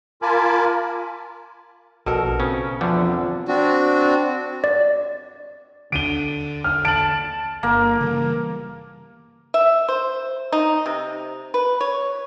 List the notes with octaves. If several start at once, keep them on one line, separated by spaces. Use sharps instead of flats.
F4 A#4 G#5 A5 B5 D6
A#1 B2 A4 A#4
C#3 C4 C#4
E2 D3 F3 G3
C4 D4 F#4
D5
D3 D4 D7 D#7 G7
F6
A5 D7 F#7
G1 A#3
C#3 E3 G3
E5
C5
D#4
C3
B4
C#5